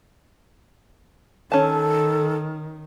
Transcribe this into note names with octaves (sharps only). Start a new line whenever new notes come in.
D#3 C#4 A4 A5